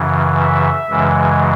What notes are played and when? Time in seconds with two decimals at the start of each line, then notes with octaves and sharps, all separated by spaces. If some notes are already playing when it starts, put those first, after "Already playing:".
Already playing: F#2 C#3 E3
0.40 E5
0.89 F#2 C#3 E3 G#3